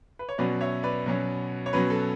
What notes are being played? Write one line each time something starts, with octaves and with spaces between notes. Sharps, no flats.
B4
C#5
B2 F#3 C#4 B4 D5
C#5 E5
B4 D5
B2 F#3 C#4
C#5
B2 F#3 C#4 B4
A4